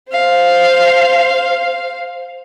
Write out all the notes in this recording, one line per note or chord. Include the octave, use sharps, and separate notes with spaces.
C5 F5